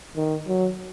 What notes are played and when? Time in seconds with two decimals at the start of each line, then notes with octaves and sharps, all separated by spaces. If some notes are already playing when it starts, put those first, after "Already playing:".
0.16 D#3
0.48 F#3